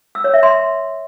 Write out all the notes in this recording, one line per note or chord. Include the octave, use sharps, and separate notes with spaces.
E6
C#5
E5
C6